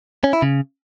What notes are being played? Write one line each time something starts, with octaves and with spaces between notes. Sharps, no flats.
C#4
E4
C#3